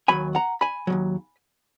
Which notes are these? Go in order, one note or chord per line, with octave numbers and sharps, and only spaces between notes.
D#2 D#3 F#3 G#5 B5
F#5 A#5
G#5 B5
D#2 D#3 F#3